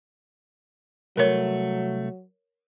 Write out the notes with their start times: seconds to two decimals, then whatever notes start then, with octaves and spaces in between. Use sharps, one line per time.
1.17 C2 F#3 A3 A#4 C#5